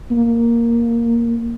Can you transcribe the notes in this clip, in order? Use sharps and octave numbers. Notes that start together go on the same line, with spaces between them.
A#3